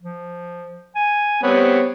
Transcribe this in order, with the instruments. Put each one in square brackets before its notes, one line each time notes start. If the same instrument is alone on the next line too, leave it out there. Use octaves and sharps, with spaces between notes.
[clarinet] F3
G#5
[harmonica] G3 B3 C4 [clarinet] C#5